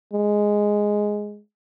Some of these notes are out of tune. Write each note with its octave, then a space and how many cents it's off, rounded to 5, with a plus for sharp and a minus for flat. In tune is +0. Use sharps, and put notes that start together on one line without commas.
G#3 +0